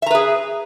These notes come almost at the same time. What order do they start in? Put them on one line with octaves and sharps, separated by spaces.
E5 A#5 B4 G#4